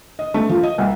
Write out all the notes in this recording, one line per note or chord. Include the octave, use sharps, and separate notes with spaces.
D#5
A3
F3
D#5
C2